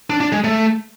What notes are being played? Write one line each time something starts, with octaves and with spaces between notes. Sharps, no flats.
D4
D4
G#3
A3